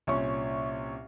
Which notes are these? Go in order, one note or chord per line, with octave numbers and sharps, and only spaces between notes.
C2 A#2 C#4 C#6